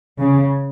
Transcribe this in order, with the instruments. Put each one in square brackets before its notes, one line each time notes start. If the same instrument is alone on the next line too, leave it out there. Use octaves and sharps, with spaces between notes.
[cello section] C#3